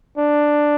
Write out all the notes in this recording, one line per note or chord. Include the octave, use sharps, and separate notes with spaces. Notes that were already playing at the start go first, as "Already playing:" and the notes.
D4